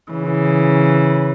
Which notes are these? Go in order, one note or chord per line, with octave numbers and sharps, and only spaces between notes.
C#3 E3